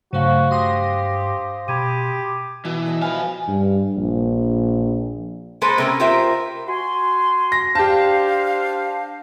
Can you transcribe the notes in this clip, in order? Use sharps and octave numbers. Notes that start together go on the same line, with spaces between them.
G2 C#3 F#3 A3 F#4 C5 F5
G4 C6 D#6 A#6
B2 G4 B5 G#6 D#7
B2 E3
A4 D#5 E5
F3 B4 F5 G5 G#5 B5
G2
A#1
G#3 A#3 A4 B4 C5
C3 A#3 C#4
F4 G4 A#4 C5 E5
F#4 G#5 C6
A#6
D4 G4 C5 F5 A5